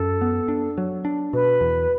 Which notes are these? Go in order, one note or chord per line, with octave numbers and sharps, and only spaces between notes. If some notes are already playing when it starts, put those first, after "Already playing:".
Already playing: F#2 A4
B3
D4
F#3
D4
B2 B4
E2